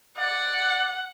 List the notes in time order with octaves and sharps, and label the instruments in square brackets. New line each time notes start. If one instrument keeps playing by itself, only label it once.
[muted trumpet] D5 [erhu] F#5